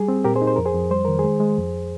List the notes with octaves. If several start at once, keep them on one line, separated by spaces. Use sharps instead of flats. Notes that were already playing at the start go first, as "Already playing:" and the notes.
Already playing: G3 G#4
C4
A#2 G4 A#4
G#4 C5
D#4
C5
F2 A#4
G#4 C5
F2
G3 C5
D#3 A#4
G#4 C5
G#3
G#3
F2